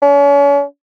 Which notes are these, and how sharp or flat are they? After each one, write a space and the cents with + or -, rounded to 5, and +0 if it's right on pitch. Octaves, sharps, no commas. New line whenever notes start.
C#4 +40